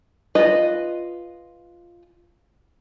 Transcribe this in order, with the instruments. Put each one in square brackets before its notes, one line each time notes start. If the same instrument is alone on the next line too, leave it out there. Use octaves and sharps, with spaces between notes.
[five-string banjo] F4 B4 D#5